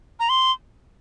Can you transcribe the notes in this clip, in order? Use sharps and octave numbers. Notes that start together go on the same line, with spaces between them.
A#5
C6